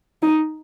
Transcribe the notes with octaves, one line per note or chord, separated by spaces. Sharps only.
D#4